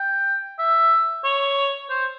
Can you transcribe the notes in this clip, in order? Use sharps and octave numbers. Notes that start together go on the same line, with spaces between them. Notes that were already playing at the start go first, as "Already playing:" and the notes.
Already playing: G5
E5
C#5
C5